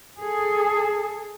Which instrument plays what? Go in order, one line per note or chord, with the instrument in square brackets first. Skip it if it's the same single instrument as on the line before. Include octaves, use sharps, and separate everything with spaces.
[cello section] G#4 A4